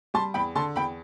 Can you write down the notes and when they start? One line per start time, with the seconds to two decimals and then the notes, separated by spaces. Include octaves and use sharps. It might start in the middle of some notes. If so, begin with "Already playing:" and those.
0.14 G3 A5 C6
0.34 E2 G5 B5
0.55 D3 A5 C6
0.76 E2 G5 B5